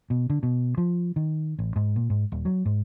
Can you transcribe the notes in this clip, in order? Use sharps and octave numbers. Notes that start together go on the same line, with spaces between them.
B2
D3
B2
F3
D#3
A1
G#2
A#2
G#2
D#1
F#3
G#2